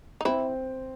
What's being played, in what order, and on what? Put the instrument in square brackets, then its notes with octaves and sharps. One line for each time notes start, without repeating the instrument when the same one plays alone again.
[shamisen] D#4
[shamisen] E3 E4 [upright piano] C4